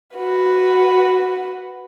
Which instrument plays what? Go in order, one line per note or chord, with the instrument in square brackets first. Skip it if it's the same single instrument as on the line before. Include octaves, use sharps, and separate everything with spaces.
[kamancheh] F#4 B4